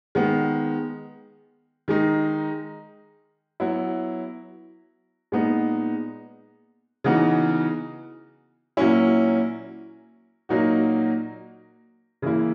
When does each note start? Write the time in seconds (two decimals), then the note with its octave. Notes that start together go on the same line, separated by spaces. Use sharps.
0.15 D#3 G#3 B3
1.88 D#3 G#3 D#4
3.60 F#3 B3 E4
5.32 A#2 G#3 B3 D#4
7.04 C#3 E3 B3 D#4 F#4
8.77 A#2 F#3 A#3 C#4 E4
10.49 A#2 F#3 A#3 D#4 F#4
12.22 C#3 E3 A#3 E4